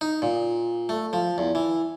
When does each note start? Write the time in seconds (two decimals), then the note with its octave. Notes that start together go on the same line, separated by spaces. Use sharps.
0.01 D#4
0.22 A#2
0.89 A3
1.13 F3
1.38 E2
1.55 E3